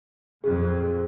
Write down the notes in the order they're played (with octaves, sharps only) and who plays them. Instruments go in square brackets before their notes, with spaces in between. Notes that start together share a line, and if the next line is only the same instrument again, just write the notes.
[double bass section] F2 A#2 [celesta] G#4